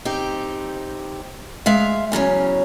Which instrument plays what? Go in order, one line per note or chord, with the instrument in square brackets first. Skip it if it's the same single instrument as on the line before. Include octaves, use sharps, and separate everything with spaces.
[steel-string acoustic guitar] C4 D#4 G4
G#3 E5 F5
E2 C#3 F#3 C#4